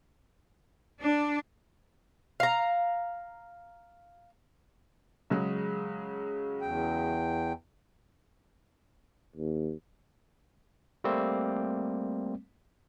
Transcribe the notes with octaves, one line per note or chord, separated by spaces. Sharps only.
D4
F5 A#5
C#3 F#3 G#3
E2 G5
D#2
G3 A3 A#3 C4